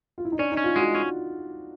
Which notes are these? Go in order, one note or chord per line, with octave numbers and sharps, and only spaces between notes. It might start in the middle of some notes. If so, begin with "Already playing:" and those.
F4
E4
D#4
C#4 D4
D#4
C#4
F4
G#3 F#4
C#4